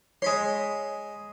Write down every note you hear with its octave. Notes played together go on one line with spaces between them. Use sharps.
G#3 C#5 B5 C6